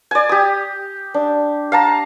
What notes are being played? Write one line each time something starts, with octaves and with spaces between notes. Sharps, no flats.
D5 G#5
G4 D#6
D4
F5 A5 A#5